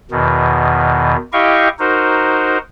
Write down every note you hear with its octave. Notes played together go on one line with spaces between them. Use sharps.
E2 B2 D#3
E4 G4 D#5 F5 G5 C#6
D#4 F#4 A#4 C5